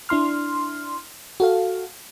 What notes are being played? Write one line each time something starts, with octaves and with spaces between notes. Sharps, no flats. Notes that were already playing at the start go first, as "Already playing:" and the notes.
D4 E4 C6 F6
F#4 A4 F5